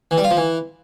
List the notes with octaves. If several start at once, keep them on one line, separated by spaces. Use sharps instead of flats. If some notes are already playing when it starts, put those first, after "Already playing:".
E3
G3
F4
F3
E3